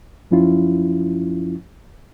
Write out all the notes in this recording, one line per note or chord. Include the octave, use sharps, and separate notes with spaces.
F#2 F3 C#4 E4 F4